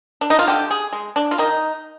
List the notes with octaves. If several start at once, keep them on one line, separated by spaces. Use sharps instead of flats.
D4
D#4
F4
D3 G4
G#4
G#3
D4
F4
D#3 D#4